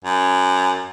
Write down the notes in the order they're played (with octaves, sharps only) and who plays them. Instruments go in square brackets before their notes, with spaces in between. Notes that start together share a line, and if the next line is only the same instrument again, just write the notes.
[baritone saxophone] F#2